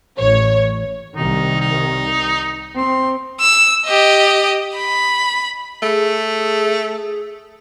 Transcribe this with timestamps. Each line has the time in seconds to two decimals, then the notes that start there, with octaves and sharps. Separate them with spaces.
0.18 A1 C#5
1.16 C2 D#3 D#4
1.61 D#4
2.77 C4 C6
3.40 E6
3.86 G4 D#5
4.76 B5
5.82 A3 G#4